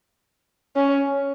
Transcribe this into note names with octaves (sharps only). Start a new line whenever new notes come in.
C#4